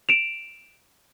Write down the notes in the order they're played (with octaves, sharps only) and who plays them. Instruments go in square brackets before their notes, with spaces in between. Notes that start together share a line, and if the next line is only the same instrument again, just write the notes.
[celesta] D7 E7 F7